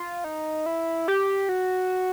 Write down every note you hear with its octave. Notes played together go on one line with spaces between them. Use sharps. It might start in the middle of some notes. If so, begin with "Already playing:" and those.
Already playing: F4
D#4
E4
G4
F#4